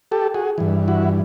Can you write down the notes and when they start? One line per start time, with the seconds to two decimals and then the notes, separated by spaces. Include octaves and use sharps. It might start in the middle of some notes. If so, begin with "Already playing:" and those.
0.12 G4 A4
0.34 F#4 G#4
0.58 G2 E3
0.88 E4 F#4